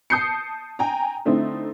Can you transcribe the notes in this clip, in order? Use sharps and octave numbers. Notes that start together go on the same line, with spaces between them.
A5 D#6 G6 C7 C#7
G5 G#5 A#5
D3 A3 C4 D#4 E4